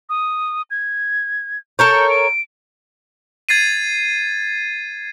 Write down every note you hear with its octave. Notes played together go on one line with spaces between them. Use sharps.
D#6
G#6
A4 A#4 C#5 G6
D7
G#6 A6 C7 D#7